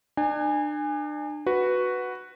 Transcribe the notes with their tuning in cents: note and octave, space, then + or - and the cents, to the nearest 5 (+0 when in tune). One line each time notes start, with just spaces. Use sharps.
D4 +35 G#5 -15
F#4 +0 B4 +0